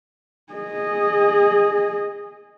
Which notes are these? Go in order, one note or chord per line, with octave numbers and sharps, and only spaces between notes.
G#4 D#5